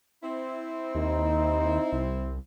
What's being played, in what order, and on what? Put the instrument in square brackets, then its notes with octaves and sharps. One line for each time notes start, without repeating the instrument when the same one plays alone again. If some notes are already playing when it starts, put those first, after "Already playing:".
[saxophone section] C4 E4
[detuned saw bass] D#2 [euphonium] D#4
[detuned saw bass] C2